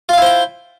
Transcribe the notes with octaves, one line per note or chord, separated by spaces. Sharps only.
E4 F4 C5 F5 G5